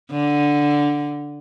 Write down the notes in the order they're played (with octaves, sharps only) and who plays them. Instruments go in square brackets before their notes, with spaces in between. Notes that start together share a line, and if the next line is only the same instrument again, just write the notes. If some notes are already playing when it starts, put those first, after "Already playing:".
[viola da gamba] D3